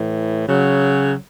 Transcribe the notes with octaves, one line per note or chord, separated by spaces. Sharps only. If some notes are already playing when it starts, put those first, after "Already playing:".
Already playing: A2 E3
C#3 F#3